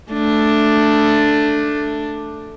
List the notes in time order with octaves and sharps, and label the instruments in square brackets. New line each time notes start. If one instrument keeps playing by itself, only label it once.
[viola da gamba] A3 D4